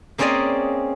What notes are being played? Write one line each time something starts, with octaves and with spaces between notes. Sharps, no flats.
A#3 C4 C#4 G#4 D5 D#5